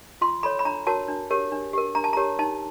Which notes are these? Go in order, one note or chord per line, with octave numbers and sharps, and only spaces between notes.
F4 C6
A4 C#5 B5
B5
D4 A#5
F#4 A#4 C#5 A5
D4
G4 A#4 C#5
D4
G4 A#4
D4 A#5
A5
G4 A#4 C#5 A#5
D#4 A5